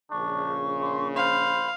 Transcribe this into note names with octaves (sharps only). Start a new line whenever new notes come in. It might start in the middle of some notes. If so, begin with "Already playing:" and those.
A#1 C#3 D4 C#6
C6
C5 F5 B5